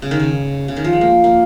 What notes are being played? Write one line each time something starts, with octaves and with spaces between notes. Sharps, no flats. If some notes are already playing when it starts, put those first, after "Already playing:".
C#3
D#3
C#3
C#3
D#3
F3
G#3
A#3
A#3